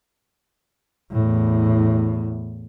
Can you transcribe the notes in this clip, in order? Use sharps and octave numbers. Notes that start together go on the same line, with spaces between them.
E2 A2